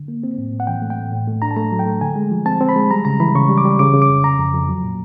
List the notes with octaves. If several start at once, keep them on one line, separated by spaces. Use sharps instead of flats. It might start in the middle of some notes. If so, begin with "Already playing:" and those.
Already playing: D3
A#3
C4
A2
A2
F#5
E3 G5
A3
G5
A2
A2
A3
D4 A#5
A5
A3 A#5
F#3
G5
A3
D3 G#5
G#3
F3
C4 A5
C4
B5
G#3
G3 A#5
C#3 A#5
E3 B5
C#3 C#6
G3
D6
G3
C#3 D6
C#3
D6
F2
C#3 A#5
F2
F2
F#3
A#2